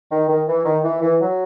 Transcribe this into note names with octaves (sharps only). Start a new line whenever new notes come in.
D#3
D#3
E3
D#3
E3
E3
F#3